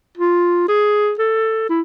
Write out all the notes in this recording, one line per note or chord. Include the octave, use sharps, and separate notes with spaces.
F4
G#4
A4
E4